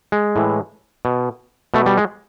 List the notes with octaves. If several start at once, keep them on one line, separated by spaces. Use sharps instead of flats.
G#3
A2 E3
B2
B2 A3
G3
G#3